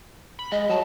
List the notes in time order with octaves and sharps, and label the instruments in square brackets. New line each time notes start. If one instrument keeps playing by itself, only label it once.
[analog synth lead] B5
[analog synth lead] G#3 [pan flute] D#5
[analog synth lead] F#3 [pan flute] A5